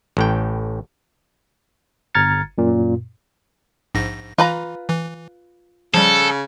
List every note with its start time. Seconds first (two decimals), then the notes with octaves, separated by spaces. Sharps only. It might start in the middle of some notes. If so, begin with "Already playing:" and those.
0.17 A1 A2 G5
2.15 G1 A#5 F6 G#6 A6 C#7
2.58 F#2 A#2
3.95 A#1 G#2 A#6
4.38 E3 F4 B4 A#5
4.89 E3
5.94 C#3 F3 G3 A4